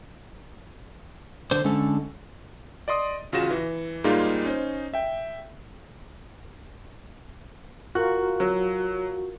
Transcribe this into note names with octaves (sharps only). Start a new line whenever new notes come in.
D3 C5
D3 G#3 C#4 A4
D5 D#5 C6 D#6
A1 C#3 F4 F#4 A#6 E7
E3
G#2 G3 G#3 A#3 D#4 F4
C#4 D#4 C5
E5 G5
F4 F#4 A#4 F#6
F#3